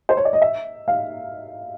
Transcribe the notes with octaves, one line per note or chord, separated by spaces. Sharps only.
C5
C#5
D5
D#5
E5
F5